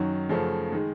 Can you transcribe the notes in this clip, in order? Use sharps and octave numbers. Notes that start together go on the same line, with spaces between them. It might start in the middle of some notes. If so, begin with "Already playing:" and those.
Already playing: F#2 D#3 F#3
F#2 C#3 F3 A3
D#3 G#3